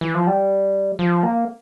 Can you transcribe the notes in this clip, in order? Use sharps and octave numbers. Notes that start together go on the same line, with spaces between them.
E3
F3
G3
F3
A#3